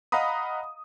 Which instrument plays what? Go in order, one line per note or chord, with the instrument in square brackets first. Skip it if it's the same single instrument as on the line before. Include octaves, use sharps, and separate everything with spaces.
[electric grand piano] D#5 F5 F#5 A#5 B5 D#6